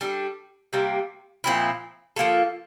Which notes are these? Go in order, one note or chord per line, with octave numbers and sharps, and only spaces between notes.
G3 D4 A4
C3 G3 A#3
A#2 F3 C4 E4
F3 A#3 F4 A4